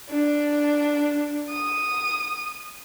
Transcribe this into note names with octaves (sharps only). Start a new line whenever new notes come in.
D4
D#6